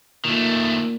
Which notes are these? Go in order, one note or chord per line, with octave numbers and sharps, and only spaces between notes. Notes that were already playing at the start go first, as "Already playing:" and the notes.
A#2 D#3 A3